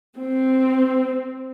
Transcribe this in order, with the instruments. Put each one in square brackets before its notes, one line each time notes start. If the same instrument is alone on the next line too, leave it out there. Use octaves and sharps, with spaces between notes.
[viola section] C4